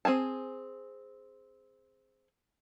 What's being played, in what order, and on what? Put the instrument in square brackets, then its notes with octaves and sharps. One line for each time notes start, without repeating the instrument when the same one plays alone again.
[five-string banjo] C4 G#4 G#5 A5